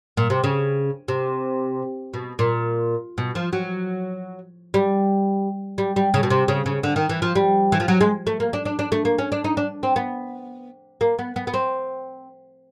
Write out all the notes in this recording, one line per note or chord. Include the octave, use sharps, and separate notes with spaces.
A#2
C3
C#3
C3
B2
A#2
B2
F3
F#3
G3
G3
G3
C#3
B2
C3
C#3
C#3
D3
D#3
E3
F3
G3
E3
F3
F#3
G#3
A3
A#3
D4
D4
D4
A3
A#3
C#4
D4
D#4
D4
C4
B3
A#3
B3
B3
B3
C4